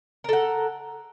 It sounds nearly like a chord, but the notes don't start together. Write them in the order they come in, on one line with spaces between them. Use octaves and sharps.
A#4 A4 F#5